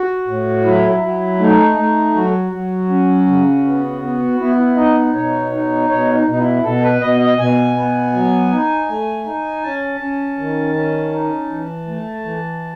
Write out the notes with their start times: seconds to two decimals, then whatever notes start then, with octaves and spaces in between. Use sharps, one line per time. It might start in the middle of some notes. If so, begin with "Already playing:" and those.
Already playing: F#4
0.27 A2
0.65 F#3 E4
1.02 F#3
1.40 A3 D#4
1.78 A3
2.15 F#3 F#4
2.52 F#3
2.89 C#4
3.27 C#3
3.65 B3
4.02 B3
4.40 B3 E4
4.57 E4
4.76 D#4 D#5
5.14 B2 C#5
5.51 D#4
5.89 B2 C#5
6.14 D#4
6.27 B2 D#4
6.38 E4
6.63 B2 A4
6.83 B4
7.01 B2 D#5
7.20 D#5
7.38 B2 G#5
7.76 B3
8.13 F#3
8.52 D#4
8.89 A3
9.25 D#4
9.63 C#4 A5
10.00 C#4
10.39 D#3
10.75 C#4
11.12 D#4
11.50 E3
11.88 A3
12.25 E3